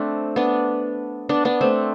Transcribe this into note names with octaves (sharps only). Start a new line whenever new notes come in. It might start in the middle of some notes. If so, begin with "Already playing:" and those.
Already playing: A3 C4 D4
B3 D4
B3 D4
B3 D4
A3 C4